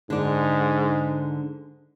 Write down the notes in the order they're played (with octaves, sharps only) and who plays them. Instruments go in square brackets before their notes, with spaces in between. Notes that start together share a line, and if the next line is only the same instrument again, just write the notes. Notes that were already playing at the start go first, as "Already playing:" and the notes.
[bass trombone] G#2 [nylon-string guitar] D3 D5